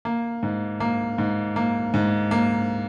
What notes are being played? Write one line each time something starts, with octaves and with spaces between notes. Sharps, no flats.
A#3
G#2
A#3
G#2
A#3
G#2
A#3